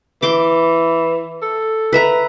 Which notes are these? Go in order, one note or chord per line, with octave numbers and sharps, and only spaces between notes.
E3 C6 D6
A4
B4 E5 A#5